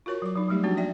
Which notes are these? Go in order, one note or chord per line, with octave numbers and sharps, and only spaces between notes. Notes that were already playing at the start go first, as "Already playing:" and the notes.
F4 F#4 A#4 C#5 C#6
F#3 D6
F#3 D#4
F#3 G3 A3 D#4 G4
F3 A#3 C4 D4 F#4
D5 E5 G5